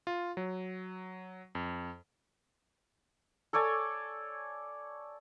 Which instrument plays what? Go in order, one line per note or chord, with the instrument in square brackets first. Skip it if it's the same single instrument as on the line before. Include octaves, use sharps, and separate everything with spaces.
[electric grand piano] F4
F#3
F2
[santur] A4 C#5 D5 G#5